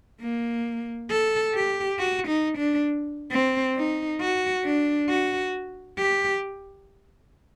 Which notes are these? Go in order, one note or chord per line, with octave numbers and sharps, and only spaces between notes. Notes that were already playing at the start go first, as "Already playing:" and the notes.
A#3
A4
G4
F#4
D#4
D4
C4
D#4
F#4
D4
F#4
G4